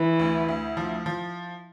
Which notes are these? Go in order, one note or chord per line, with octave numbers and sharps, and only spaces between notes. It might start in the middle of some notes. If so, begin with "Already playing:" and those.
Already playing: E3
D2
D2
F3
F3